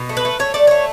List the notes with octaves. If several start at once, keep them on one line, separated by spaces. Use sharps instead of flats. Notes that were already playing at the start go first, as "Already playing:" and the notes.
Already playing: B2
A3
B4
A3
A3 C#5
A3 D5
A3 C#5